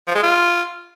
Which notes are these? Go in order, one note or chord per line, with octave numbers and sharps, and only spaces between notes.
F3
G#3
F4